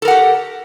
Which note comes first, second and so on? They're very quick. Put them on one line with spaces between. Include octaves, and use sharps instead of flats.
A4 A#4 F#5 G4